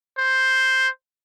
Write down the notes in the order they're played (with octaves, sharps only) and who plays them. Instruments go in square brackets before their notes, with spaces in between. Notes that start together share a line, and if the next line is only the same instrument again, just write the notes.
[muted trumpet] C5